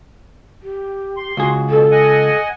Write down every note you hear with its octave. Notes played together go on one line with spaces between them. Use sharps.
G4
C6
C#2 F#4 G#4
B2 A4
D#5 F#5 G#5